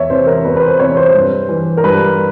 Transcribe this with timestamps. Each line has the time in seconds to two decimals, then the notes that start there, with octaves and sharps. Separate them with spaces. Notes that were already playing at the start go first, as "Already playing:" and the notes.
Already playing: E2 C#5 E5
0.10 C3 E3 C5
0.27 A#4
0.44 E2 B4
0.56 B4
0.62 C5
0.80 C3 E3 C#5
0.97 C5
1.14 G2
1.49 E3
1.77 A#4
1.84 G2 B4